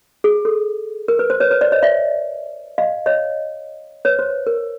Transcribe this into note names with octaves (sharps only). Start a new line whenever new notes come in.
G#4
A4
A#4
B4
C5
B4 C#5
B4 C#5
C5 D5
C#5 D#5
D5 E5
D#5 F5
C#5 D#5
B4 C#5
C5
A#4